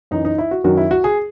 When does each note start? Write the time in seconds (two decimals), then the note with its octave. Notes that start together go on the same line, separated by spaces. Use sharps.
0.11 F#2 E3 D#4
0.25 D#4
0.38 E4
0.51 F#4
0.64 F#2 D#3 F#3 F#4
0.77 E4
0.91 F#4
1.04 G#4